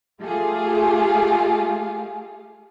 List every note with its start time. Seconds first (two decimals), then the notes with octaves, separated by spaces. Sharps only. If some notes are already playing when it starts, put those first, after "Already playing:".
0.22 A3 F4 G4 G#4 F5